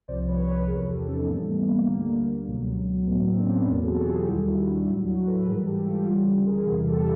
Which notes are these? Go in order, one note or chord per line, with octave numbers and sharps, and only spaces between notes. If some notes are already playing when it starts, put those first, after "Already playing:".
C2 C3 F3 C5 D5
B4 C#5
B4 C#5
E2 C3 F3 G#4 A#4
G4 A4
C#4 D#4
B3
G#2 E3 G3 A#3 C4
A3 B3
A#3
D2 D3 G3 A#3
C#2 B2 F#3
A2 F#3 A3 B3
A#3 C4
D4
B3 C#4
E2 B2 F#3
A4
F#4 G#4
F4 G4
D#2 D#3 G3 E4 F#4
E4 F#4
D4 E4
A2 F#3 E4 F#4
E4 F#4
A4 B4
B4
G#2 E3 G3 G#4 A#4
G4 A4
F4 G4
D2 C#3 E3 G3 F4 G4
G#4 A#4
E2 C3 E3 G3 F#4 G#4
G4 A4